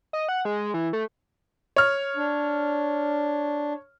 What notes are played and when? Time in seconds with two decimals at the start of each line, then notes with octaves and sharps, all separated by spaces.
0.13 D#5
0.29 F#5
0.45 G#3
0.74 E3
0.93 A3
1.76 C#5 F6
2.16 D4